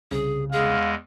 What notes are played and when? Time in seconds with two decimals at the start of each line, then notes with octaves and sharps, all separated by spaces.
0.11 C2 C#3 G#4
0.52 E2 G#3 G#4 F5